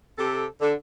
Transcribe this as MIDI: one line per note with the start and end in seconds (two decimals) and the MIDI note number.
0.17 0.45 48
0.17 0.45 67
0.17 0.45 69
0.61 0.73 50